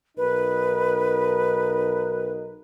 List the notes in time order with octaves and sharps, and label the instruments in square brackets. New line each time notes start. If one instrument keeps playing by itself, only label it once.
[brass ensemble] B1 D#4 A#4 [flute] B4